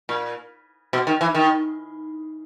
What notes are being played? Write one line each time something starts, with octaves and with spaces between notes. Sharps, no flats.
A#2
B2
D#3
E3
D#3